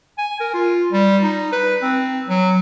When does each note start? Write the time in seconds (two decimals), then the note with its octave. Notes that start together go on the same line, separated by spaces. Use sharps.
0.18 G#5
0.40 A#4
0.54 F4
0.92 G3
1.23 D#4
1.52 B4
1.82 C4
2.27 F#3